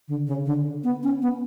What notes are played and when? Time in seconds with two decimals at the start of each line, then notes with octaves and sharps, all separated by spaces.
0.08 D3
0.27 C#3
0.46 D3
0.84 B3
1.03 C#4
1.22 B3